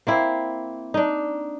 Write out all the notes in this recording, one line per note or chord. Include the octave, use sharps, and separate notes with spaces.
A#3 C4 E4
D4 D#4